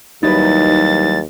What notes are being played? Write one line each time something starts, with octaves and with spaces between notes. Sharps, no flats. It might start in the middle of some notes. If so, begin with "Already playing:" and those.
D#2 F#3 G3 D#4 E4 B4 A6